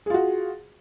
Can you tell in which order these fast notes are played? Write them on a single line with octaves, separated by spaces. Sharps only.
G#4 F4 F#4